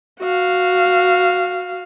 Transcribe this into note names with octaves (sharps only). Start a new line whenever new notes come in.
F#4 F5